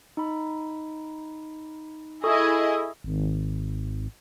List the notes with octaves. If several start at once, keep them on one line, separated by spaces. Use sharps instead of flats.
D#4 B5
E4 G#4 A4 D#5 C#6 D#6
G#1